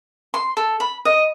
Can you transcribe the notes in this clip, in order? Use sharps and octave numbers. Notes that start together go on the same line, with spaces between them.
C6
A4
B5
D#5